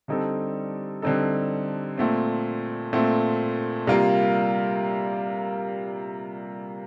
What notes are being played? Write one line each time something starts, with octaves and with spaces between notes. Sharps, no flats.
D3 G3 C4 D#4 A4
D3 G3 C4 D#4 A4
A#2 A3 C4
A#2 A3 C4
C3 G3 A#3 F4 A#4